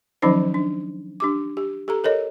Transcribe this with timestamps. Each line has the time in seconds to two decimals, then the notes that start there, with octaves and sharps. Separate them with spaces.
0.22 D#3 F3 F#3 C#4 D#4 C5
0.54 D4
1.20 D4 G4 D6
1.57 G4
1.88 G4 A4 A#5
2.04 A4 A#4 C#5 D#5